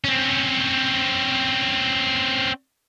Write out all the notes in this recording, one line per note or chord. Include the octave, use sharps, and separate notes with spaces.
C4 C#4